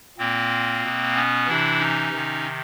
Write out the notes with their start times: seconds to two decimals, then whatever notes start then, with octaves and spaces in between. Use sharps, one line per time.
0.18 A#2 A#3 C4
0.83 B2
1.15 B3 C#4
1.47 C3 E3 D4 E4
1.79 C#4 D#4
2.12 C3 D#3